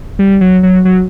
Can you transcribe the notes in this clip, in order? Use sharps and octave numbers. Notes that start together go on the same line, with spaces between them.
G3
F#3
F#3
F#3